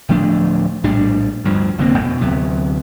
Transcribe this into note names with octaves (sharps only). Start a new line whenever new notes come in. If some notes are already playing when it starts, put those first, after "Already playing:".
D1 F3 A3 D4
A#1 A2 G3 D4
D2 G2 F3
F1 D3 A#3 C4
F2 B2
D2 C3 F#3 B3